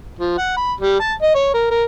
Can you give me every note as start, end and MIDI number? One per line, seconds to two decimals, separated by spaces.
0.19 0.34 53
0.38 0.53 78
0.57 0.73 83
0.80 0.97 55
1.00 1.13 81
1.22 1.34 75
1.35 1.51 73
1.54 1.67 70
1.71 1.84 70